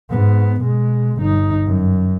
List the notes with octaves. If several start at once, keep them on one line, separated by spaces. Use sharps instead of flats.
G#2 B3
B2 G#3
G1 D#4
F#2